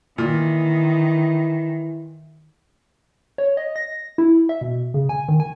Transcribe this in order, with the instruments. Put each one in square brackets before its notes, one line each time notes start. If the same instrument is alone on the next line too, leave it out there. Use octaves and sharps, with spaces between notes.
[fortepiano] A#2 [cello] D#3 [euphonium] E3
[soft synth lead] C#5
D#5
A#6
E4
E5
B2
C#3
G#5
D#3
G#5